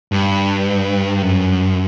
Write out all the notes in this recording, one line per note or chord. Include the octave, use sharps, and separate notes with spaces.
G2
F#2